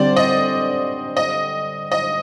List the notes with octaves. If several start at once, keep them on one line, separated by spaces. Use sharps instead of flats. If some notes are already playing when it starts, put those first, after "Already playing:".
Already playing: D3 G3 C4 C5 D5
D#5
D#5
D#5